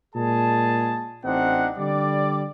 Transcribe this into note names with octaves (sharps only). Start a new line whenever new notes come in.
A#2 G#3 G#4 A5
A1 C4 D4 D#4 F#5
D3 G3 D5